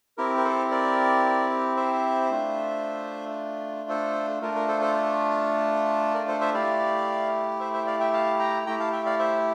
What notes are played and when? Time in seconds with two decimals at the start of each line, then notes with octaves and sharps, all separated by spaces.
0.18 C4 E4 G4 A#4
0.37 A#4
0.44 A4 C5
0.71 A#4 D5
1.77 C5 E5
2.30 A3 D4 F4
3.89 A4 C5
4.42 A3 D4 F4 A#4
4.55 A#4
4.68 A4 C5
4.82 A4 C5
6.14 A#4 D5
6.28 A4 C5
6.41 C5 E5
6.54 A3 E4 G4 D5 F5
7.60 C5 E5
7.73 C5 E5
7.81 G5
7.86 D5 F5
8.00 E5 G5
8.14 F5 A5
8.39 G5 A#5
8.66 A3 E4 G4 G5 A#5
8.80 F5 A5
8.93 E5 G5
9.06 D5 F5
9.19 C5 E5